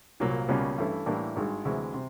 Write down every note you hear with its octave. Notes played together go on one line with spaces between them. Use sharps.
C2 A#2 F#3 A#3
C#2 B2 G3 A#3 C#4
G2 E3 A3 C#4
A2 E3 G3 A#3 D4
G#1 G2 D#3 G#3
D2 C3 E3 G#3
C3